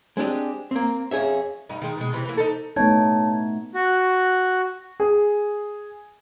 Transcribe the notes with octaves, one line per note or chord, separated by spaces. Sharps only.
G#3 C4 D4 G4 D#5
A#3 C4
F2 C#4 G#4 C#5 E5
G2 D#4
D#3 G#3
B2 G#3
C3 E3
E3 A#3
D#4 A4
A3 B3 D#4 C#5 A5 G#6
F#4
G#4